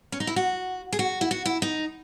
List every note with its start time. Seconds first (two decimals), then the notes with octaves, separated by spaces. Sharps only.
0.12 C#4
0.20 D#4
0.27 E4
0.36 F#4
0.92 G#4
0.99 F#4
1.21 E4
1.31 F#4
1.45 E4
1.62 D#4